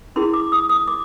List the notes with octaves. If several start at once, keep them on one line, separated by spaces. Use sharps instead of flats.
C#4 E4 G#4 C6
D6
D#6
D#6
D6